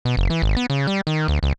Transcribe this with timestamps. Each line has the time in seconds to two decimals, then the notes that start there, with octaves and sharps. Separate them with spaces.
0.05 B2
0.17 F#1
0.30 E3
0.42 G#1
0.57 B3
0.70 C#3
0.87 G3
1.07 D#3
1.28 D2
1.43 C#2